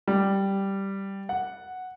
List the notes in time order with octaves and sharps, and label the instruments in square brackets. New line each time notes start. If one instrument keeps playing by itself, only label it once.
[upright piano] G3
F#5